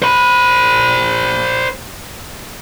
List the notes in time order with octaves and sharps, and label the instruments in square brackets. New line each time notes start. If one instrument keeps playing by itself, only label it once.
[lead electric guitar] C5 B5